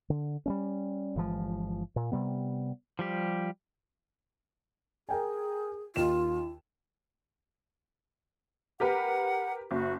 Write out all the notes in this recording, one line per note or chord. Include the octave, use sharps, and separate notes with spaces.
D3
G3 A3 C#4
G1 E3 F3 G#3
A#2
C3 G3 B3
F3 G3 G4
G#4 A#4 G5 G#5
D#2 D#4 F4 E7
G4 A#4 B4 F#5
F#1 F#4